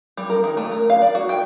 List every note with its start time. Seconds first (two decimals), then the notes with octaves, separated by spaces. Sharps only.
0.17 G3
0.30 A#4
0.44 D#3
0.57 A3
0.71 A#4
0.90 F5
1.02 D5
1.15 F#4
1.29 G5